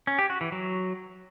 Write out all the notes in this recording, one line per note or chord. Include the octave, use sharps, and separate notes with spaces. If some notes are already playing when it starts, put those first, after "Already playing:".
C#4
G4
F#4
E3
F#3